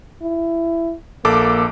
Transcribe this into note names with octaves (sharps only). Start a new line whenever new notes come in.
E4
A#1 A#3 A4 D6